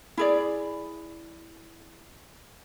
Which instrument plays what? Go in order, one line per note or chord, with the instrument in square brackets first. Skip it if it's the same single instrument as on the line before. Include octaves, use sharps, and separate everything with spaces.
[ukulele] E4 G#4 D5